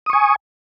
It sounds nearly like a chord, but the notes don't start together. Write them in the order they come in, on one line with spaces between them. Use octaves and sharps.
D#6 C#6 G#5